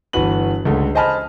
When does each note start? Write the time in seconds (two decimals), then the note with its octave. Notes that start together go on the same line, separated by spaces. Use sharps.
0.13 G1 E3 F#4 B4 F#7
0.65 C#2 D3 A3
0.95 C5 D#5 G#5 A5 B5 F6